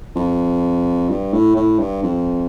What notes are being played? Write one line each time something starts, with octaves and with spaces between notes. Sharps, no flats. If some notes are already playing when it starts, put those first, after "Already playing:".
F2
G2
A2
A2
G2
F2